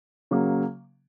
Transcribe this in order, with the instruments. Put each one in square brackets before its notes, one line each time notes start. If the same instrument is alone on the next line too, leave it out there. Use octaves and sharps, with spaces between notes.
[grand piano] C#3 F#3 A#3